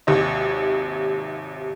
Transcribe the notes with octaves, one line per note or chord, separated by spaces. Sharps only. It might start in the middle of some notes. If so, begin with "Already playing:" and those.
G#1 D#2 C3 D#5